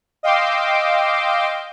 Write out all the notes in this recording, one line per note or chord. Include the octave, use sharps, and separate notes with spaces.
D#5 F5 G5 C6 D6 E6